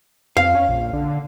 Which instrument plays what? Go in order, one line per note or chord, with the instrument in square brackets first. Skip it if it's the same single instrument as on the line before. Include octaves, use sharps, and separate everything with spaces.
[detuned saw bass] F2 [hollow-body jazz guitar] F5
[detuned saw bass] C#4
A#1
D3